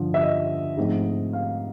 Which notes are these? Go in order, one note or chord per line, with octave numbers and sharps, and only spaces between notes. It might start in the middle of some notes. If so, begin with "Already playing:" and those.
Already playing: G2 D3 F3
E5
D#5
G#2 F3 A3 C4
F5